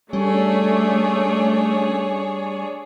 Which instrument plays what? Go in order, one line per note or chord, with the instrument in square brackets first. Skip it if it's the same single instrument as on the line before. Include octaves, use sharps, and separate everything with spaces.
[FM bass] G3 [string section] A3 [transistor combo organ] C#4 [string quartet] D4 G#4 C#5